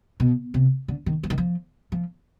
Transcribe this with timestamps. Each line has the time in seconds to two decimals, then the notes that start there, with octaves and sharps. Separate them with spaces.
0.20 B2
0.54 C3
0.88 D3
1.06 D#3
1.23 F3
1.30 D#3
1.38 F3
1.92 F3